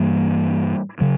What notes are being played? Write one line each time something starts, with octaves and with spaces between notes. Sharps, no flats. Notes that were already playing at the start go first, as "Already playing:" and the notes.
Already playing: G2 E3 G3 A#3
C#3 F#3